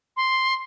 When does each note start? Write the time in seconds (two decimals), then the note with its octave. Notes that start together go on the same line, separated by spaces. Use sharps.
0.17 C6